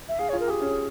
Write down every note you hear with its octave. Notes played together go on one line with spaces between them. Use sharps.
E5
G#4 F5
C#5
F4
A#4
G4 G#4
C#4